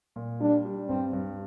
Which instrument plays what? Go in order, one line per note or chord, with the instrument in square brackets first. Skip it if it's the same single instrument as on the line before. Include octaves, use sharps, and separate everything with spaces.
[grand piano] A#2
[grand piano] G3 [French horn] D4
[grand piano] G3
[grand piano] G2 [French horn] C4
[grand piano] G2